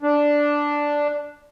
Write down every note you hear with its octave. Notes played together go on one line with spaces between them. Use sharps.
D4